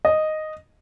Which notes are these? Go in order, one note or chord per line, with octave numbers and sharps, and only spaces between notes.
D#5